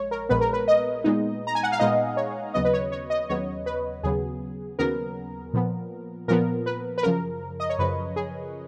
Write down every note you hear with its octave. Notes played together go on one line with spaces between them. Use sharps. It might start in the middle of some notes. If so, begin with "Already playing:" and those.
Already playing: A#1 G#3 C#5
A#4
A#1 A#2 G#3 B3 B4
A#4
B4
D#5
A#2 G#3 B3 D#4
A#5
G#5
F#5
F5
A#2 G#3 B3 D#4 D#5
C#5
D#2 C#3 F#3 B3 D#5
B4
C#5
C#5
D#5
D#2 C#3 F#3 B3 C#5
B4
D#2 C#3 F#3 B3 G#4
D#2 C#3 F#3 B3 A#4
A#2 F3 B3
A#2 F3 B3 A#4
B4
B4
F#2 C#3 F3 A#4
D#5
C#5
F#2 C#3 F3 B4
G#4